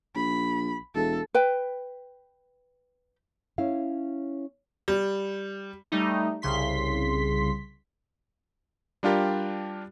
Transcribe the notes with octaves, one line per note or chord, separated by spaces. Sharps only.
A#1 B5
E1 A4
B4 G5
C#4 E4 F5
G3
G3 A3 D#4
C2 C#3 C6 B6
G3 D4 F4 G4 A#4